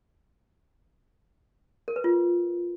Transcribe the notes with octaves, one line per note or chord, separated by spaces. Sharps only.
A#4
B4
F4